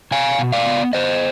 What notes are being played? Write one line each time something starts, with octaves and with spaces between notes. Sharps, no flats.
B2 F5 G#5
B2
D5 F5
B3
B3 C5 D#5